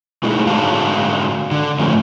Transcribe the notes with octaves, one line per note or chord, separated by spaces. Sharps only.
B2 G#3 A3 D#4 E4 G#4
G#2 D3 G#3 F#4 F5 A5
D3
G#2 F3 A3 C#4